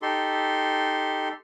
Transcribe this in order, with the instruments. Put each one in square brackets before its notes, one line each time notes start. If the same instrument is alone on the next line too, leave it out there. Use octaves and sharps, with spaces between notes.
[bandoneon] D#4 G4 A4 C6